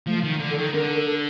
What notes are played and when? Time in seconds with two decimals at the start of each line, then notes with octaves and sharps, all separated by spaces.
0.07 F3 A3
0.24 D#3
0.40 D3
0.51 A4
0.58 D#3
0.74 D3 A#4
0.96 A4